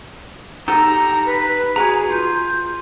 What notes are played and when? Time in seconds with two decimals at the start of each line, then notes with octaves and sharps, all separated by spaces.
0.68 D#4 G4 A4 A#5
1.26 B4
1.76 F#4 G#4 B4 A#5
2.11 F4 G6